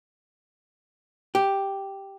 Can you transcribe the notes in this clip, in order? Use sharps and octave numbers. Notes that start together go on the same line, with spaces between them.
G4